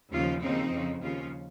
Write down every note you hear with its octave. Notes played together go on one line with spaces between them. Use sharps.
D#2 C#3 F3 C#4 F4
D#2 C#3 F3 C4 D#4
F2 C#3 F3
D#2 C#3 F3 C#4 F4